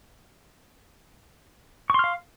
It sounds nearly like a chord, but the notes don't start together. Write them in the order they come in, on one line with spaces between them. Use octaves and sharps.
C#6 C6 F6 F5